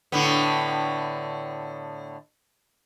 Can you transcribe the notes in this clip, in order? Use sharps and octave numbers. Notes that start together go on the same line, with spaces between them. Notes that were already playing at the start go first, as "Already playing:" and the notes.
A2 D3 B3